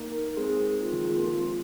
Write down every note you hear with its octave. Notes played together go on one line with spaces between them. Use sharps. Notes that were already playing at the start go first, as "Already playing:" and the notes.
Already playing: A#3 D#4
A#4
G#3 C4 G#4
F4
D#3
F3
G#3
A#3
G#3 C4